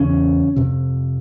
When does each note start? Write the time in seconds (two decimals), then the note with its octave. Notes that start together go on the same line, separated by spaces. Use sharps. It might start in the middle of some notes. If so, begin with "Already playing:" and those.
Already playing: E2 C#3 C#4
0.56 F2 C3